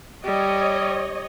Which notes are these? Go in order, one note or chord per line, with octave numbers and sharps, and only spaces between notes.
G3 C#5 D#5